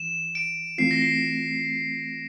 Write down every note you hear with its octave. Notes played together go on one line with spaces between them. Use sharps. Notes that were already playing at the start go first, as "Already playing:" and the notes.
Already playing: E3 E7
D7
E3 A3 C4 F4 C7
A#6
C7